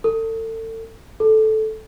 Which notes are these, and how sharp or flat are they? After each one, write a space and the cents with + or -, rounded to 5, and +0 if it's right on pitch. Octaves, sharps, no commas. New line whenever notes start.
A4 +35
A4 -10